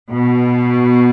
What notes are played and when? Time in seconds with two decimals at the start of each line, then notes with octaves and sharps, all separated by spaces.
0.12 B2